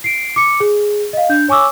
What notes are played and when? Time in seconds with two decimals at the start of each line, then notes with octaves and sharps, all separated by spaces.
0.04 C7 D7
0.36 D6 C#7
0.60 G#4
1.13 D#5 F5
1.29 D4 G6
1.48 C#5 G#5 C#6 D6 E6